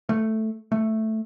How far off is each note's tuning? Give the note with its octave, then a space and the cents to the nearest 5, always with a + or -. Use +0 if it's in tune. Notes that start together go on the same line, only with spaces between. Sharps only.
A3 +0
A3 +0